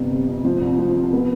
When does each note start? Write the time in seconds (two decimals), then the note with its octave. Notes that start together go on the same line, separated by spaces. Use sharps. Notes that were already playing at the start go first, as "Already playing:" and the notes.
Already playing: G1 C3
0.11 C3
0.28 F2
0.45 F3
0.61 C2
0.78 F3
0.96 C3
1.13 B3